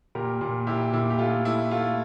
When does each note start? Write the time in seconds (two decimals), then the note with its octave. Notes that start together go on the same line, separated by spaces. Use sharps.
0.15 A#2 G4 A#4
0.41 A#2
0.67 A#2 E4 G4
0.93 A#2 E4
1.10 G4
1.19 A3 F4
1.45 A3 E4
1.71 A3 F4